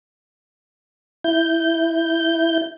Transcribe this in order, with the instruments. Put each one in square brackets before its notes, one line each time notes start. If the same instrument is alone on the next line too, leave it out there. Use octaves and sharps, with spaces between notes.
[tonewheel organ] E4 G6